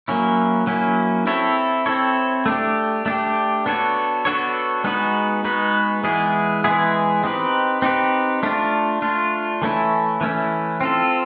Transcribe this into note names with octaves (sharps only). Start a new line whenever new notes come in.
F#3 A#3 C#4 E4
F#3 A#3 C#4 E4
C4 E4 A4 C#5
C4 E4 A4 C#5
A3 D4 G4
A3 D4 G4
B3 D4 F#4 A4 C#5
B3 D4 F#4 A4 C#5
G#3 B3 D#4 F#4 B4
G#3 B3 D#4 F#4 B4
E3 G#3 B3 E4 G#4
E3 G#3 B3 E4 G#4
C4 D#4 G4 B4
C4 D#4 G4 B4
A3 D4 F4
A3 D4 F4
E3 A3 C#4 E4
E3 A3 C#4 E4
C4 F4 A4